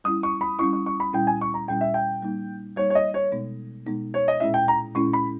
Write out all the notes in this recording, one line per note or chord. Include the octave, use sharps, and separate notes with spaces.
G3 C#4 E4 D#6
C#6
B5
G3 C#4 E4 C#6
C#6
C#6
B5
A#2 G3 C#4 E4 G5
G#5
C#6
A#5
A#2 G3 C#4 E4 G5
E5
G5
G3 A#3 D#4
G3 A#3 D#4 C#5
C#5
D#5
C#5
B2 G#3 B3 D#4
B2 G#3 B3 D#4
C#5
D#5
A#2 G#3 C#4 E4 E5
G5
A#5
A#2 G#3 C#4 E4 C#6
B5